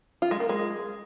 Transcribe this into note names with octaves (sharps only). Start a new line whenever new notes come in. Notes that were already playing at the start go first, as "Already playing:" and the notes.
F4
G#3
A#3
G#3